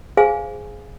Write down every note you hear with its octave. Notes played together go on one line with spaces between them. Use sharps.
G#4 C5 F5 G#5